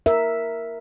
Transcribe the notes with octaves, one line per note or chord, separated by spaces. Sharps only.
A#4 E5